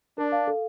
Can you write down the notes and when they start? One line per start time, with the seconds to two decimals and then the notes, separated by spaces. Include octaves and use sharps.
0.18 D4 A#4
0.32 F5
0.47 A4